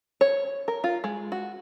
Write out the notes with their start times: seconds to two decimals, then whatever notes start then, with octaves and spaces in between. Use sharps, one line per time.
0.21 C#5
0.68 A#4
0.84 F4
1.04 G#3
1.32 F#4